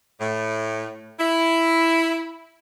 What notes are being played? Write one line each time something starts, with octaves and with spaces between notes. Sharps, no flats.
A2
E4